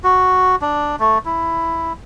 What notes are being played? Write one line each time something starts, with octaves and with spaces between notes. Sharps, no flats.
F#4
D4
A3
E4